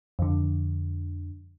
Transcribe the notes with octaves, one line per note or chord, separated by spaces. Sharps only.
F2 D3